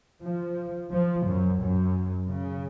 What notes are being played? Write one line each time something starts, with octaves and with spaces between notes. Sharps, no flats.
F3
F3
F#2
F#2
C#3